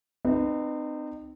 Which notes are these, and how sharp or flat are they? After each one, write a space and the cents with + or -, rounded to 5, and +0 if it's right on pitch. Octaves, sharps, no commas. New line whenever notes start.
C4 -15 D#4 -35 B4 +0